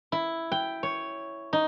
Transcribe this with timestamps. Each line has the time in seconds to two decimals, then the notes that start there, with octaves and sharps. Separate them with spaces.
0.12 E4
0.52 G5
0.83 C#5
1.53 D#4